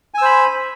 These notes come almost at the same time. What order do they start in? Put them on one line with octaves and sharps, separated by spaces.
G#5 E6 C5 B5